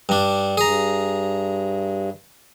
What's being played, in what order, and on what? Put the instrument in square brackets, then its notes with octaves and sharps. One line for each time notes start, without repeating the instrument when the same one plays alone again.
[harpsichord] G2 D4
[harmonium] G2 [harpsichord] G#4 A#5